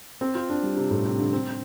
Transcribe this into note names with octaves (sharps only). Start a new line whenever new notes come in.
C4
F4
D4
G3
C3
A2
C3
D3
C4